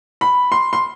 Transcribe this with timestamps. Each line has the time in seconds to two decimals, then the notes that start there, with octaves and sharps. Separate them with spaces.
0.21 B5
0.52 C6
0.73 C6